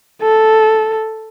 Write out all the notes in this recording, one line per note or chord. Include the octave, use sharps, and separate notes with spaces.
A4